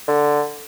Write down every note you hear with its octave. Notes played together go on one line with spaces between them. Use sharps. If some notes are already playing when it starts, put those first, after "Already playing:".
D3